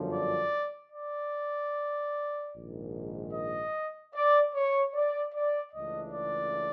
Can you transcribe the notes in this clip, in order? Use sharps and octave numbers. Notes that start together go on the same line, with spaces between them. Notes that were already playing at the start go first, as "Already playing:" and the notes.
Already playing: G1 F#2 D3 F3
D5
D5
A#1 G#2 D#3
D#5
D5
C#5
D5
D5
C#2 C#3 E3 A3 D4 D#5
D5